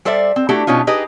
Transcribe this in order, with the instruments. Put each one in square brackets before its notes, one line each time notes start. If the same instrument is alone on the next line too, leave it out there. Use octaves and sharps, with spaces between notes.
[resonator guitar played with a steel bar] G3 A4 C5 D5 E5
C4
A3 D4 E4 F#4 G4
B2 C#4 D#4 F4
D#4 G4 G#4 B4 D#5